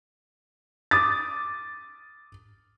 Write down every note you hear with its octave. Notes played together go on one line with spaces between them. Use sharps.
D6 D#6 A6